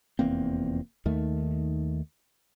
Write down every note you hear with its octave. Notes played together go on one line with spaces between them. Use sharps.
F1 E2 A#3 C4
D#2 D#3 A3